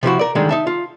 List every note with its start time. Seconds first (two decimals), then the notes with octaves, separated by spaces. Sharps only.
0.03 C3 F3 E4 F#4
0.19 A#4 D5
0.35 D3 D#3 G3 G#3
0.49 D#4 E5 A5
0.67 F4